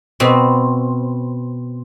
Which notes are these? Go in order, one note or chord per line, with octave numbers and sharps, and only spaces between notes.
B2 C4